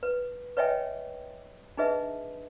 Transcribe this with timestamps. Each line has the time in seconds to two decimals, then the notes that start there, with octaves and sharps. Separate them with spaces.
0.03 B4
0.57 B4 C#5 D#5 E5 G5 G#5
1.77 D4 D#4 G#4 B4 D#5 E5